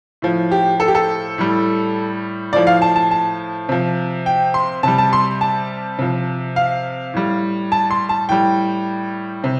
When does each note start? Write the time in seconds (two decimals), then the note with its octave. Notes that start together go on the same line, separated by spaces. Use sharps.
0.22 A2 F3
0.51 G4
0.80 A4
0.88 G4
0.95 A4
1.38 A2 G3
2.53 A2 F3 D5
2.67 F5
2.82 A5
2.96 A5
3.11 A5
3.69 C3 F3
4.26 G5
4.54 C6
4.83 C3 G3 A5
4.98 A5
5.13 C6
5.41 A5
5.99 C3 F3
6.56 F5
7.14 A2 G3
7.72 A5
7.91 C6
8.09 A5
8.29 A2 G3 G5
9.44 C3